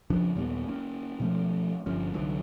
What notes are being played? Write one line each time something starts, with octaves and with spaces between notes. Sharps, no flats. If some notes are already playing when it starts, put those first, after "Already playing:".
F2 C#3 F3 D4
D#2 A#2 G3 B3
A#3 C#4
B2 F3 A3 C#4
G1 G2 F3 C#4
C2 D3 E3 F#3